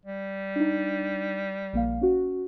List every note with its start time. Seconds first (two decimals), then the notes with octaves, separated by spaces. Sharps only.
0.06 G3
0.56 D4 D#4
1.73 A#1 A#3 F5
2.01 C#4 F#4